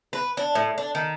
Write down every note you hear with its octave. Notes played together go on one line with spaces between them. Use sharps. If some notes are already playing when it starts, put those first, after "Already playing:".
B4
D4
A2
D4
D#3